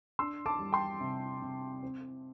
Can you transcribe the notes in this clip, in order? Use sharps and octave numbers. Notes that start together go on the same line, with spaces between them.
D4 C6 E6
A5 D6
G3
G5 C6
C3
C3
C4